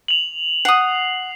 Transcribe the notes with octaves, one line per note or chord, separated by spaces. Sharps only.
F7 F#7
F#5 D#6 C7